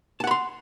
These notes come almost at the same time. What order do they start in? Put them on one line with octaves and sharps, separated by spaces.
A5 F#5 B5 C6